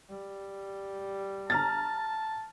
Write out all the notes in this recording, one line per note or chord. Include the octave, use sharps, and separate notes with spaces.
G3
A5 A#5 F6 A6